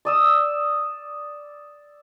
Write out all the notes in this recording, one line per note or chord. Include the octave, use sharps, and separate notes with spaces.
D5 D#6 E6